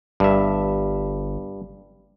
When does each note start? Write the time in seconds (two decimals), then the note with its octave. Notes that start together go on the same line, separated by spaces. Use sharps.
0.20 G1 G2 E5